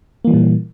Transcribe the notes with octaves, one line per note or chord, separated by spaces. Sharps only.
A#2 E3 G3 A#3